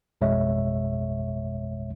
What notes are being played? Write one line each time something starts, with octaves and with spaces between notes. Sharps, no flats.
A1 F2 B2 G#3 C#5 E5